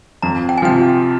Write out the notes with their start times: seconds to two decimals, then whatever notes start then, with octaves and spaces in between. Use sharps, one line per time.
0.22 F2 A#5
0.49 G5
0.58 G#5
0.62 C3 F3 G5